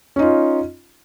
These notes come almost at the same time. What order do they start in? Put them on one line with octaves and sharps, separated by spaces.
C#4 D#4 F4